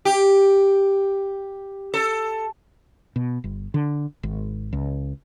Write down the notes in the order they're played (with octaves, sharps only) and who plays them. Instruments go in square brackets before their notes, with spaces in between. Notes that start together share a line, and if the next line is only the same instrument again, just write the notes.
[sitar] G4
A4
[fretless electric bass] B2
G1
D3
G#1
C#2